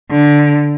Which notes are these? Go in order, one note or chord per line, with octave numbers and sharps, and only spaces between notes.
D3